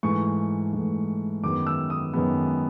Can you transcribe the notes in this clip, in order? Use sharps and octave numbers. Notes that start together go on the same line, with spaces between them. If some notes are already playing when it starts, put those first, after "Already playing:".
G#2 E3 A3 C#6
G#2 E3 A3
F#2 D#3 G#3 B3 D6
E6
D#6
F#2 D#3 G#3 B3